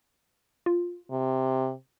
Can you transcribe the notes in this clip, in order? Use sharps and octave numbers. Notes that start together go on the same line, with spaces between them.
F4
C3